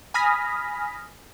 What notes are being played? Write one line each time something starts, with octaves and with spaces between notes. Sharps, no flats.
G#5 B5 D#6 F6 A#6 B6